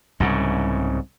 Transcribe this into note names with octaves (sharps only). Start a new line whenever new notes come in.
C2 G#2 C#3